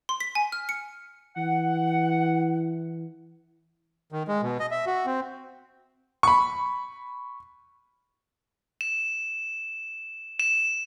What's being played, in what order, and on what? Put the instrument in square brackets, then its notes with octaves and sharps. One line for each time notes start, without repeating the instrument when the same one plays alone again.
[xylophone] C6
B6
G#5
F6
C#7
[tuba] E3 [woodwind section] F#5
[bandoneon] D#3
G#3
B2
D#5
E5
F#4
C4
[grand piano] B5 C#6
[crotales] E7
E7